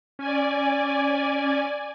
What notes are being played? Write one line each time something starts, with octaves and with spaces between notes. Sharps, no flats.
C#4 D5 G#5